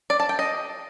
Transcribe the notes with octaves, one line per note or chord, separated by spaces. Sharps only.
D5
A5
G5
D#5